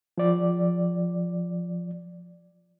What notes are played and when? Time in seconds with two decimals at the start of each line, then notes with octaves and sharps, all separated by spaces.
0.18 F3 D5